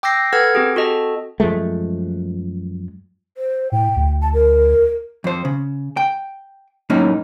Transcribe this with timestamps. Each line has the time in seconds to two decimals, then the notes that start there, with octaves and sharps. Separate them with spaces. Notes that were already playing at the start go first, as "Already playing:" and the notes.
0.03 G5 D6 E6 G6 A#6 C7
0.33 A4 B4 F#5 F6 G#6
0.55 C4 G4 G#4
0.75 C4 F#4 A4 D#5 A5
1.40 F#2 F3 G#3 A3
3.37 C5
3.72 A2 G5
3.96 D2
4.22 A5
4.34 A#4
5.24 F2 C5
5.45 C#3
5.97 G5
6.90 F#2 A2 A#3 C#4 D#4